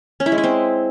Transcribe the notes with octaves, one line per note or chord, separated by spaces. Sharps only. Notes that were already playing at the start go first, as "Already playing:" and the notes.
C#4
E4
G#3
E4
C4